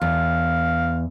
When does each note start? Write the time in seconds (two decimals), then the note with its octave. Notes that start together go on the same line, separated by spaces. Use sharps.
0.01 E2 F5